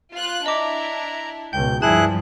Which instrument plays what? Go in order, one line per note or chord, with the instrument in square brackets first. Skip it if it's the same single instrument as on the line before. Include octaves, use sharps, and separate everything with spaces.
[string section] F4 F#6
[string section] D4 E4 [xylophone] D#5 D6 [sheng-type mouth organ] A#5
[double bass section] C#2 G#2 B2 [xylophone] G5 [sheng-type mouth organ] G6
[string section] G2 [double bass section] F3 [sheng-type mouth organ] E4 G#4 F#6 [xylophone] A5